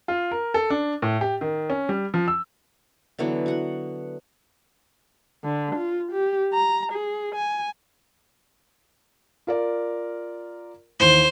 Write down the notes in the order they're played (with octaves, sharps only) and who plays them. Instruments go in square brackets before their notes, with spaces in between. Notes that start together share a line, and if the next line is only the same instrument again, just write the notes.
[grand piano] F4
A#4
A4
D4
A2
G4
D#3
C#4
G3
F3
E6
[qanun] D3 E3 F#3 B3
F#4 F#5
[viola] D3
F4
G4
A#5
G#4
G#5
[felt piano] F4 A#4 D5
[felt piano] D#2 E3 [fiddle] C5